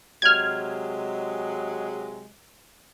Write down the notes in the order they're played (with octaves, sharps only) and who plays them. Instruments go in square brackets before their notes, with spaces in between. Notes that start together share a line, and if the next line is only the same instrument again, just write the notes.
[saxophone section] C3 F#3 G#3 [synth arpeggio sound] F6 G#6